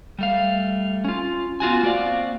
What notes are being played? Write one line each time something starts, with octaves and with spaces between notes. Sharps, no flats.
G3 A3 F5
C#4 F4
B3 F4 F#4 G#5
A#3 C4 F#4 D5 F5